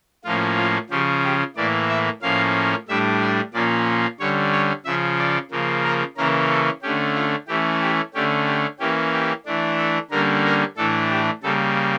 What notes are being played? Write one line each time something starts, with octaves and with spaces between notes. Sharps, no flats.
A2 F3 A#3 C#4 F4
F4
C#3 F3 C#4 G4
G4
A2 E3 A#3 D5
E5
A2 F3 A#3 C#4 F5
A2 G3 D4 E5
D5
A#2 F3 A#3 C#4 D5
D3 G3 C#4 C#5
C#5
C#3 F3 C#4 E5
D5
C#3 F3 A#3
A#4
C#3 E3 A#3 C#4 A#4
A4
D3 A3 C#4 G4
F4
E3 A3 C#4 G4
G4
D3 A3 C#4 G4
G4
E3 A#3 C#4 G4
G4
E3 A3 D4
A4
D3 G3 A#3 C#4 A#4
A#4
A2 E3 A3 D4 A4
G4
C#3 G3 A#3 A4